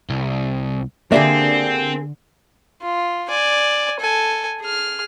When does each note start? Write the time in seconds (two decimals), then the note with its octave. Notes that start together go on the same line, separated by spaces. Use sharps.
0.10 C2
1.12 D3 A#3 C4 D4 G4 G#4 D5 E5
2.82 F4
3.29 D5 G#5
4.00 A4 G#5
4.60 G#4 F6